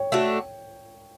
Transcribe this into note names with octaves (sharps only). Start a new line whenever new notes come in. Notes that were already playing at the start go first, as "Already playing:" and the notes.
Already playing: C#5 G5
A3 D4 F#4